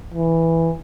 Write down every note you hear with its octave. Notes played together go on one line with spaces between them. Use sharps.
E3